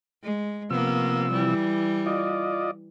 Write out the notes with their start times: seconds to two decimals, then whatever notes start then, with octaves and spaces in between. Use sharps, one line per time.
0.23 G#3
0.70 C3 F3 A#3 B3 E6
1.33 E3 G3
2.06 F4 D5 D#5